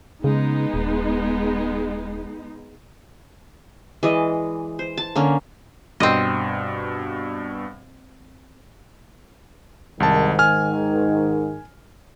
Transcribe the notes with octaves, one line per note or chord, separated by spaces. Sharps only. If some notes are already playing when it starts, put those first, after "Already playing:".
C#3 G#3 B3 D#4
D#1
E3 G#3 D5 D#5
C5
A5
D3 A#3 C#4
G2 B2 C4 D#5
C2 G#2 D#3 A5
G#5 F6